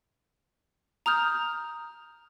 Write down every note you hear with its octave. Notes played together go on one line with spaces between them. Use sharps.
A#5 D#6 F6 G6